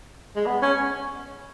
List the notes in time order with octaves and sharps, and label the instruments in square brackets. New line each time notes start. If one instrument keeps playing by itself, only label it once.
[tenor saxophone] G#3
B3
C#4